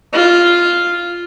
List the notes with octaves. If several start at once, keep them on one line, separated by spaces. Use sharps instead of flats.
F4